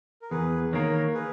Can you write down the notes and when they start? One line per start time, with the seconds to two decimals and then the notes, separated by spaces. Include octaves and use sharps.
0.22 A#4
0.31 E2 G#4 B4
0.73 D#3 A#3 A#4 C#5
1.14 G#4 B4